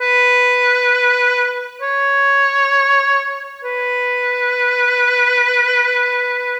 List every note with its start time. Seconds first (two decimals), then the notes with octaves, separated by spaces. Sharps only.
0.01 B4
1.82 C#5
3.64 B4